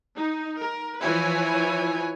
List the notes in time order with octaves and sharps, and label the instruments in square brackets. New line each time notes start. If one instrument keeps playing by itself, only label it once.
[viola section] D#4
A#4
E3 F3 E4 B4 C#5 G#5